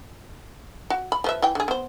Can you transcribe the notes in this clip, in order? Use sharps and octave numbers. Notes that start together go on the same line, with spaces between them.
F#4
B5
F3 B4 E5
E3 G5
D3 G#4
B3 C5